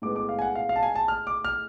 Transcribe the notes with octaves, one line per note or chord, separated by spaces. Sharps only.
A2 G#3 B3 D6
D6
F5
G#5
F#5
F5
F5
A5
G#5
A5
F6
D6
F6